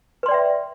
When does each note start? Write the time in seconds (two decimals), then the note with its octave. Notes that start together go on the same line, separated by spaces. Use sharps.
0.23 B4
0.26 C6
0.28 D5
0.31 G5
0.34 E5